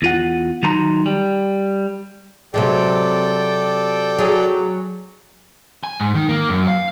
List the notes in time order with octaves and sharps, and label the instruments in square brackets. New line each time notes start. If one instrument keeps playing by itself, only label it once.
[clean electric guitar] E2 F4 F#5
D#3 F#3 D#4 A#5 C6
G3
[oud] C3 F#3 G#3 [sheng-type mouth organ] A4 D5 G5
[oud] F#3 G#4
[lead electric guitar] G#5
G#2
D#3
A#3
F#2
F5